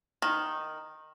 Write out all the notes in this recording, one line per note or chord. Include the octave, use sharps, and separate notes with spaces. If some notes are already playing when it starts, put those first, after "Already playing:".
D#3